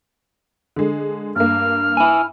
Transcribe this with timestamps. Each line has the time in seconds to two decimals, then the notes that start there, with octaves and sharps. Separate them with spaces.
0.76 D3 G#3
1.36 G2 A#3 F6
1.97 E4 G#5